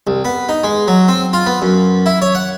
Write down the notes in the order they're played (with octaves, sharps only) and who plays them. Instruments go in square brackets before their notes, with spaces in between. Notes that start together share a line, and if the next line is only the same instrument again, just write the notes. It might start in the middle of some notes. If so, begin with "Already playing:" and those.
[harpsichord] C2
B3
D#4
G#3
F#3
C4
F4
B3
F#2
E4
C#5
F#5